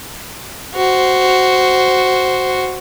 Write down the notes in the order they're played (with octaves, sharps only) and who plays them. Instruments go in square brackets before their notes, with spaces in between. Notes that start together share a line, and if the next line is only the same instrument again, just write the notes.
[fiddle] F#4 C5